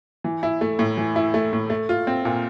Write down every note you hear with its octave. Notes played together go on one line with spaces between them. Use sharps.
E3
E4
A3
A2
E3
E4
A3
A2
A3
F4
C4
A#2